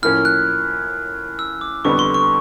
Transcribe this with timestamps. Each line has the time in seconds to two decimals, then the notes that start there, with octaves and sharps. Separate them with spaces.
0.03 A2 F3 A#3 C#4 F6
0.25 F#6
1.39 E6
1.61 D6
1.85 F2 D3 G3 B3 C#6
1.99 C6
2.14 C#6